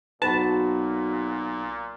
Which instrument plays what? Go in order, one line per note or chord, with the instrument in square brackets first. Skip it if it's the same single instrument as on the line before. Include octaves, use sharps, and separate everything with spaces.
[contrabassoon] B1 [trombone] A#2 [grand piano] F#4 B4 [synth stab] A5